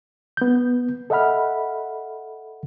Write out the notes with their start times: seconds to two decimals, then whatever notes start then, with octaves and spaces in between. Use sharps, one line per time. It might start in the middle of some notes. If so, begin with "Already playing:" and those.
0.37 B3 G6
1.10 A4 D#5 E5 F#5 B5 F6